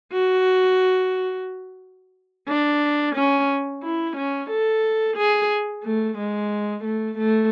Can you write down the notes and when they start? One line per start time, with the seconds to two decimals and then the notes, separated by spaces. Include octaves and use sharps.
0.13 F#4
2.48 D4
3.15 C#4
3.83 E4
4.17 C#4
4.50 A4
5.17 G#4
5.84 A3
6.18 G#3
6.84 A3
7.18 A3